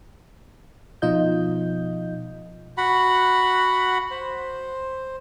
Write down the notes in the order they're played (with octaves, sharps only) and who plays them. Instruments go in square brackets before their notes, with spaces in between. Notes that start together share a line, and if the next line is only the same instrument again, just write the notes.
[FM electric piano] B2 F3 D#4 F4 D#5 G6
[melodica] F#4 F#5 B5
C5